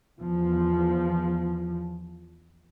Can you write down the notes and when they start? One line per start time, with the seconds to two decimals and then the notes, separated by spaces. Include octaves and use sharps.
0.19 E2 F3